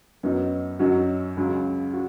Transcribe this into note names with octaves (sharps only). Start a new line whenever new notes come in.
F#2 F#3 B3 D#4
F#2 F#3 D#4 F#4
C#2 C#3 F#3
F#4